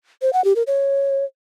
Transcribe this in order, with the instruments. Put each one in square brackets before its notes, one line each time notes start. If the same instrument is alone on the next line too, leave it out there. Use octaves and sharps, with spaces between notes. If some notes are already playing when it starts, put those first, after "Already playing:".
[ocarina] C5
F#5
G4
A#4
C#5